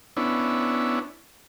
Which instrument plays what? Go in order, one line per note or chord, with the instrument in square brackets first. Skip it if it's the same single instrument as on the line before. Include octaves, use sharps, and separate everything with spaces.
[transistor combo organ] B3 C#4 D4 E4